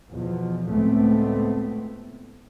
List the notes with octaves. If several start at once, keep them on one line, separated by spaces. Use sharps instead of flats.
E2 B2 F3
C#2 A2 A3 B3 C4